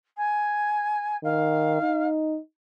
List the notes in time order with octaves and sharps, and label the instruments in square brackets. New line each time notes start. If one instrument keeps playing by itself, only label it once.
[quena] G#5
[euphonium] D#3 [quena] F5
[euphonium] D#4